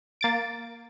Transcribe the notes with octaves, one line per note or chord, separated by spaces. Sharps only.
A#3 A6 D7